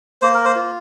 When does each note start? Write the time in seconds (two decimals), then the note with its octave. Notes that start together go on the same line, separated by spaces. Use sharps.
0.22 A#3 C5
0.34 A#4
0.45 C5
0.56 F4